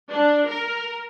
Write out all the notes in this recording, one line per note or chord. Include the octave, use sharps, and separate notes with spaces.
D4
A#4